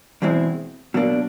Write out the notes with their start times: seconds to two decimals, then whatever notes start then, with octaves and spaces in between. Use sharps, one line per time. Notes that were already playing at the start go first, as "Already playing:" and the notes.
0.22 E2 B2 G#3 C4 E4
0.94 B2 F#3 A#3 D4